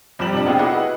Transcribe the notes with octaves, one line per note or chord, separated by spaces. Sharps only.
F1 F2 F3 G3 E7 F#7
C3 D4
B3 C4 F4 G4 G#4
E4 F#4 G#4 B4 D#5 F#5